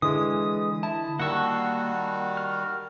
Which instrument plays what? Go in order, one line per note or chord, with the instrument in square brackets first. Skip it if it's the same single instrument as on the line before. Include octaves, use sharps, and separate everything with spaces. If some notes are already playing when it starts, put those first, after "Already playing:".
[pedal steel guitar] D3 [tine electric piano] E3 G#3 [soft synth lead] D#6
[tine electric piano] E4 [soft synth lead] A5
[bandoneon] D#3 G3 F#4 [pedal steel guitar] A#3 C#6 [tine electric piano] F#5 E6
[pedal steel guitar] F6